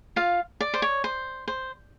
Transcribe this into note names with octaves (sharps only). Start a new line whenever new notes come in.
F4 F5
D5
C5
C#5
C5
C5